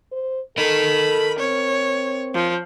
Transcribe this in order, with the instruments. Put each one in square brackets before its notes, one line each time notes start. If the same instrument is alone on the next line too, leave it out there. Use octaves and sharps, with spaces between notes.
[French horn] C5
[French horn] A4 [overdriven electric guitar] A#4 D#5 [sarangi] B5
[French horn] C4 [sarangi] C#5
[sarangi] F3